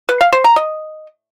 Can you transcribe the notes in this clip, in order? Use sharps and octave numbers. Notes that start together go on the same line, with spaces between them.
B4
F5
C5
A#5
D#5